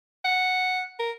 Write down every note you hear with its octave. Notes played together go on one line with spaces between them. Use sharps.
F#5
A#4